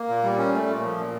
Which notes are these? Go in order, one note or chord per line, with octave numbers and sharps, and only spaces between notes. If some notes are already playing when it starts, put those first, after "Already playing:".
Already playing: A#3
A#2
G3
C#4
A3
A#2
F3
A#2